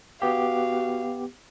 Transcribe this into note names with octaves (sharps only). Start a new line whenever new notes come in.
B3 F#4 G4 F5